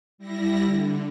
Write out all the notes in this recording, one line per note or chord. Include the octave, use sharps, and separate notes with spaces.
G3 E4 A#6
D3